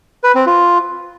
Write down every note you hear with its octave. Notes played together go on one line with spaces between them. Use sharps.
B4
C4
F4